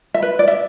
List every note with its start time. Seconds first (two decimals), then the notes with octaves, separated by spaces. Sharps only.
0.14 E5
0.22 B4
0.39 D5
0.48 E5